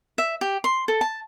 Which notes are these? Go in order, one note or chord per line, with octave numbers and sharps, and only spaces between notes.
E5
G4
C6
A4
A5